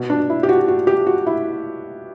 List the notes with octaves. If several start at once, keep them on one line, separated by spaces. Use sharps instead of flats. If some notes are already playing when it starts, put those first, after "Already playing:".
Already playing: B2
D4
E4
G4
F#4
F#4
G4
F#4
E4